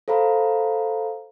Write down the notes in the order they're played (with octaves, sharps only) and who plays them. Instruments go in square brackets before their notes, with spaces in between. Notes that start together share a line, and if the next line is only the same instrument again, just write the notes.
[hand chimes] A4 C5 F5 A#5 B5